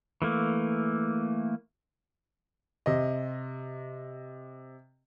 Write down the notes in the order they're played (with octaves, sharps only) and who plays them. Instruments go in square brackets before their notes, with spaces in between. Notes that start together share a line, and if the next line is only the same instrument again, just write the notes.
[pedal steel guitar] E3 A3 A#3
[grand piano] C3 D#5